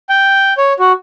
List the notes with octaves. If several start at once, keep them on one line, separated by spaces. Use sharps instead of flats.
G5
C#5
F#4